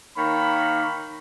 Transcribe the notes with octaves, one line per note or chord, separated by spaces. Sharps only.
D#3 A#3 C#5 B5